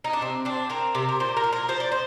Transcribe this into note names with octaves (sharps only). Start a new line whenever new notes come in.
D#4
D4
C3 C4
C4 D4
C4 A#4
C3
A#4
A#2 C5
A#4
F3
A#4
F3 C5
D5
C5